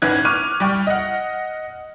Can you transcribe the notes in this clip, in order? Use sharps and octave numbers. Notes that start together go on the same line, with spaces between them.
G#1 D#3 C#4 B4 F#6 G#6
C#6 D6 F6 D#7
G3 G5 C#6 F6
D#5 F#5